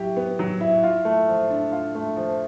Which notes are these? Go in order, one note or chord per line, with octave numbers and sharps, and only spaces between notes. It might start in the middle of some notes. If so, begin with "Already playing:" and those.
Already playing: F#3 E4 G4
B3
F#3
E4
F4
A3
F3
D4
F4
A3
F3